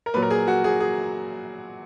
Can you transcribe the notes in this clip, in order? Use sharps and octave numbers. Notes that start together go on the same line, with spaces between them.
A#4
A#2 F#3 B4
A#4
G#4
F#4
G#4
G#4